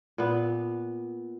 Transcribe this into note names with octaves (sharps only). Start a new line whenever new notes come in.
A#2 B3